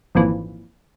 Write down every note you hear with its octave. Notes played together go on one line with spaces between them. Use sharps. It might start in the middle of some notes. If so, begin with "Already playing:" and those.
G#1 F2 A#2 E3